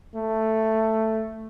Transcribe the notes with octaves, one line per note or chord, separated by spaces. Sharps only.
A3